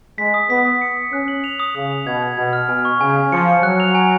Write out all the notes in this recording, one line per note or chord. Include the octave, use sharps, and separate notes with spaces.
G#3 B6
D#6
B3 B6
D#6
C#7
D#6
C#4 F#6
F#7
F7
D#6
C#3 D#6
F7
B2 G#6
G#6
B2 G#6
F6
B2 G#5
C#6
C#3 G#5
G#5
F3 C#7
C#7
F#3 F#6
F7
G#5